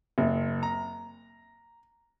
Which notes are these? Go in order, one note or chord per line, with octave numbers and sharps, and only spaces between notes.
F#1
A#5